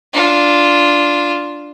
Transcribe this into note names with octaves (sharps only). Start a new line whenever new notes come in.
D4 F4